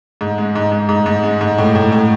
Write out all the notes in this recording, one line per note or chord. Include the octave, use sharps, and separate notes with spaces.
G#2
G#3
G#2
G#2
G#2
G#2
G#3
G#2
A2
A2
A2